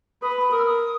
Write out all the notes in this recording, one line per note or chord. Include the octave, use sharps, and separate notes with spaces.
B4 D#6
B5
B5
A#4 D#6
E6
D#6